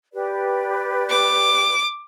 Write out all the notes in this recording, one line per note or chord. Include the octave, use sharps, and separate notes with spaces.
G4 B4 D5
D6